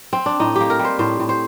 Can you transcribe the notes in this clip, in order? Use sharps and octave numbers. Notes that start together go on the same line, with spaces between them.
C4
D4
A2 D#4
A#3 G4
A#4
G3
C5
A2 C5
A2
C5